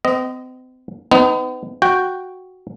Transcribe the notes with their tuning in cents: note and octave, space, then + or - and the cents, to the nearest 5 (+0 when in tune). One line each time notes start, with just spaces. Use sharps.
C4 -40 D#5 +0
B3 +40 D#4 +0
F#4 +0 G5 +0